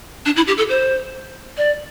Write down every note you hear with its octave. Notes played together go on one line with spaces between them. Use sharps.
D4
E4
G4
A4
C5
D5